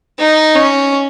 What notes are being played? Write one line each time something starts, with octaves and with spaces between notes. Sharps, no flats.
D#4
C#4